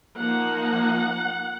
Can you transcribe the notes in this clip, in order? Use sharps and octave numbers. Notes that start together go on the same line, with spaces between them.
F3 A#3 D#4 F#5